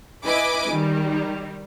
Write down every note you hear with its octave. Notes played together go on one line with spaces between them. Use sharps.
E4 B4 D#5 G#5 B5 D6
D#3 G3